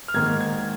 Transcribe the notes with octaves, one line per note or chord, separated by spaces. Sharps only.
F6
G#2 D#3 A#3 G#6
G#6